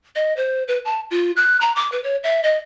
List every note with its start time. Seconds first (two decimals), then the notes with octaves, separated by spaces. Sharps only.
0.16 D#5
0.37 C5
0.68 B4
0.85 A5
1.11 F4
1.37 F#6
1.61 A#5
1.76 D6
1.92 B4
2.04 C#5
2.23 E5
2.44 D#5